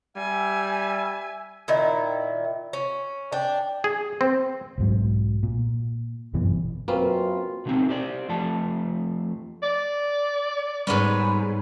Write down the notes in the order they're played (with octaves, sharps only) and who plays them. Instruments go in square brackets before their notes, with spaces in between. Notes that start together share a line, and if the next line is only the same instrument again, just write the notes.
[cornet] G3 [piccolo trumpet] E5 [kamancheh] G#5
[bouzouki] A#2 D#3 E4
C#4
D4 G5
[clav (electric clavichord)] G#4
C4
[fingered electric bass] B1 G#2 F#3
A#2
G1 F#2 B2 E3
[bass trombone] F#2 [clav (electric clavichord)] A#3 C4 C#4 [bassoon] F4 [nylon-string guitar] B4
[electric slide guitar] B2 D3 F#3 G#3 C4 D#4
G4 C5 D5
F2 F3 A3 A5
[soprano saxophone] D5
[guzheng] G#2 B3 C#4 [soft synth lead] G3 [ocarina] B5